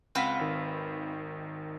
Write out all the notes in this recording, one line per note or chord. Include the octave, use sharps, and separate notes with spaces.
C#2 C4 B4 F5 F#5 B6
G#1 D#3